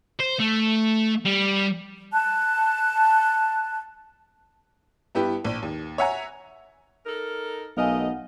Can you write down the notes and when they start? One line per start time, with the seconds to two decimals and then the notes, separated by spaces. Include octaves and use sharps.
0.20 C5
0.40 A3
1.25 G3
2.13 A5 F#6
5.15 G2 B3 E4 G4
5.45 A#1
5.62 D#2
5.98 C#5 E5 F#5 G#5 A#5
7.05 D#4 A4 A#4
7.77 B1 A3 A#4 D#5 F5 G#5
7.96 F#5